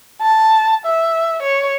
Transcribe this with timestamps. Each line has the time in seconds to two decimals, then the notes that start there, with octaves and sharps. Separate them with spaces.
0.22 A5
0.85 E5
1.42 C#5